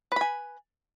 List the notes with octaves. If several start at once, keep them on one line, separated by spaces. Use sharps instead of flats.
B4 G#5 B5